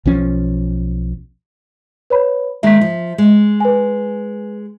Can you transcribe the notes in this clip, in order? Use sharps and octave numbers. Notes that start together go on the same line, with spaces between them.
B1 F3 C#4
B4 C#5 B5
D#3 G#3 A#3 E5 B6
F3
G#3
B4 G#5